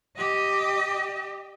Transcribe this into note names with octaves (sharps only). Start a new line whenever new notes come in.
G4 D#5